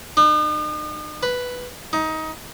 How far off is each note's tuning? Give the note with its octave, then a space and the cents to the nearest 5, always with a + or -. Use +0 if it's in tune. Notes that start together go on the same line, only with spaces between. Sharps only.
D#4 -45
B4 +0
D#4 +20